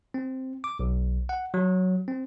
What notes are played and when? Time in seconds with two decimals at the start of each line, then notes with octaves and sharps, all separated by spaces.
0.14 C4
0.64 D6
0.79 B1
1.29 F#5
1.54 F#3
2.08 C4